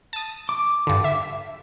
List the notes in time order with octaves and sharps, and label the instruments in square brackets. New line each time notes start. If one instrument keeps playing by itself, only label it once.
[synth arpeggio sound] A5 D#6
[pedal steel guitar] D6
[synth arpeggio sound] G2 D3
E5